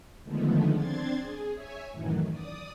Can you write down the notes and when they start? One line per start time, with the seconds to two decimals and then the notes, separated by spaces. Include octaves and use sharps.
0.23 D3 D#3 F3 G#3 A3 B3
0.73 C4 D4 C6 G#6 A6
1.17 G#4
1.53 C#5 E5 G#5
1.92 F#2 A2 D#3 E3 F#3
2.28 D5 D#6